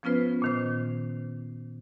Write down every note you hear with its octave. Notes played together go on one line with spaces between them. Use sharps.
F3 B3 C#4 F4 B4 C5
A#2 D#3 C5